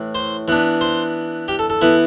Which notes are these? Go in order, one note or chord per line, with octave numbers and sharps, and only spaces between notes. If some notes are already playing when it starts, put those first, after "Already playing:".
Already playing: A2 E3
C5
E3 B3 D4
C5
G4
A4
A4
E3 B3 E4